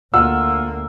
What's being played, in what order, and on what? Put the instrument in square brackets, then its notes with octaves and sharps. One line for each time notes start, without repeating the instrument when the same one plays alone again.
[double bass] D2 A#3 [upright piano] F4 F#5 E6